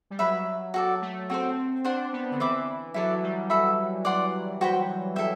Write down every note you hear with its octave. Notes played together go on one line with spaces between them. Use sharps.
G3
F#3 B4 E5 B5
F#4 A4 D5
A3
C4 F#4 A4 C5
D4 C5 F#5 C6
B3
D3
E3 C5 E5 B5 D6
F#3 E4 A4 D5
G3
F#4 A4 E5 B5
D5 F#5 C6
F#4 C5 G5 B5
E4 A4 E5 G5